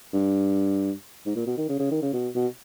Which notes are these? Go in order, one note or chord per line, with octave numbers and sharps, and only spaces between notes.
G2
G#2
A#2
B2
D#3
C#3
C#3
D#3
C#3
B2
B2